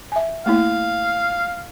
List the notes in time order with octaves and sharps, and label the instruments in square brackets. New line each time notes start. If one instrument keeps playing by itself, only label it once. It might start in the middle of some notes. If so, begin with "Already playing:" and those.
[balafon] E5 G#5
[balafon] A3 A#3 E4 [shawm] F5